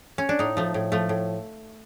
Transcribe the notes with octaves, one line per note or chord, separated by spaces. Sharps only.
C#4
D4
A2 D#4
F3 A3
A2
F3 A3
A2